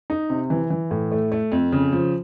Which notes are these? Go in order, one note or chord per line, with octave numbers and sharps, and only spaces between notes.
D#4
C3
E3
E3
A2
A3
A3
F2
C#3
F3